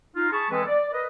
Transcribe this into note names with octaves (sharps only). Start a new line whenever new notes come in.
D#4 F4
G#4 A5 B5 C#6
E3 G#3 C4 G#4 A4 B4
D5
A#4 B4 D#5